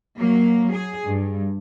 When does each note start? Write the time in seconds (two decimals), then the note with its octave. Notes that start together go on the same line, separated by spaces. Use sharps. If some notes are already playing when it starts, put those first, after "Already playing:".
0.18 F#3 A#3
0.74 G#4
1.05 G2